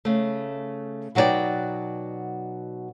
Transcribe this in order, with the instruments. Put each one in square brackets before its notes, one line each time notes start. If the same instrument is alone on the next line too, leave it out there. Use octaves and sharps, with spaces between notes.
[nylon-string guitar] C#3 A3
B2 F#3 D#4 F#4 D5 G5